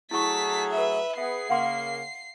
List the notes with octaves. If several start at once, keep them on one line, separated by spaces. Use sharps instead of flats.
F#3 A3 E4 G#4 A5 C#6 B6
B4 E5
B3 G#4 E5 C7
C#3 A#3 F5 F#5 C6